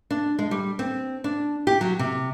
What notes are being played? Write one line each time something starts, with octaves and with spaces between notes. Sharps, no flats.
D4
G#3
G3
C4
D4
G4
F#3
C3